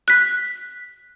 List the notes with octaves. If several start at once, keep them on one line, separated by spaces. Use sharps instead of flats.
F#6 B6